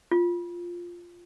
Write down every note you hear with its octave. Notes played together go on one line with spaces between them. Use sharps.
F4